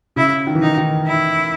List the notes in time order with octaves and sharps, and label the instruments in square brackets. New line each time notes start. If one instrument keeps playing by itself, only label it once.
[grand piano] C#3 [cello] E4
[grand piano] D#3
E3
[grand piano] D#3 [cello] D#4
[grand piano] D#3
[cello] E4